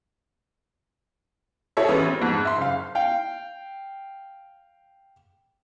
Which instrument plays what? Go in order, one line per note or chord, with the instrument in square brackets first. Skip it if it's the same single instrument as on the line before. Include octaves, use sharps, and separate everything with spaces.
[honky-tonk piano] E4 G#4 A4 C#5 E5
A1 C#4 B4
C4
F2 G#2
E5 C6
F#1 F5
[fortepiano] F5 G5